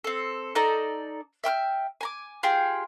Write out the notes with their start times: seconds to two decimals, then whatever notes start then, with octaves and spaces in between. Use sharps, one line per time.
0.04 C4 A4
0.55 D#4 A4 D5 A#5
1.44 E5 G5 E6 F6
2.01 G#5 A#5 D6
2.43 F4 G4 G#4 G5